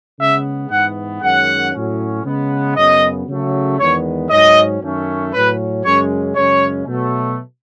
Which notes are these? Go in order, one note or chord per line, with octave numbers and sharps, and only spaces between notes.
C#3 G#3 B3 E5
G#2 E3 B3 F#5
F#2 D#3 G#3 C#4 F#5
A2 F#3 C#4
C#3 G#3 B3
F#2 C#3 F#3 B3 D#5
C#3 F#3 A3
E2 D#3 G#3 B3 C#5
G#2 F#3 C#4 D#5
F#2 D#3 A3 C#4
A2 F#3 C#4 B4
F#2 C#3 G#3 C#4 C#5
F#2 C#3 G#3 C#4 C#5
B2 F#3 A3